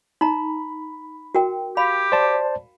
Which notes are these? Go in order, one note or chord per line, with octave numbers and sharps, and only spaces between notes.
D#4 A#5 B5
F#4 A#4 G5
G4 F5 B5
C5 D5 A5